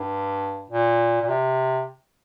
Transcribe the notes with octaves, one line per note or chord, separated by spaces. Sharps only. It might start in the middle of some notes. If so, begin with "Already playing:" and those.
Already playing: G2
A#2
A#2
C3